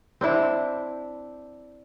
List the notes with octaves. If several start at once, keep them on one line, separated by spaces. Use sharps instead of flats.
C4 D4 E4